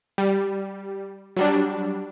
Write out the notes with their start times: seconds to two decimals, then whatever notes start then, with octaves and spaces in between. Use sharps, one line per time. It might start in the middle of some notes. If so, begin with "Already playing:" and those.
0.18 G3
1.37 F#3 G3 D4